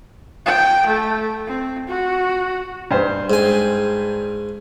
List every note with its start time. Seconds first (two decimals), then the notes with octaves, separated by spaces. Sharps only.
0.45 G5
0.87 A3
1.47 C4
1.88 F#4
2.91 G2 C5
3.30 G#2 G#5